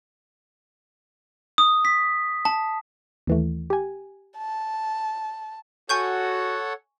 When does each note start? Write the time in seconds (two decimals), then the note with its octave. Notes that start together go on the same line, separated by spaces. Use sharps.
1.58 D#6
1.85 B6
2.45 A5
3.27 D#2 E3 A3
3.70 G4 G#5
4.38 A5
5.89 F#4 A4 C#5 F#5 G#5 C#6 G6